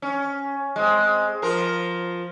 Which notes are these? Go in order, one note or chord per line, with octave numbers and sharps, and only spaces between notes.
C#4
G#3 C4
F3 F4 A#4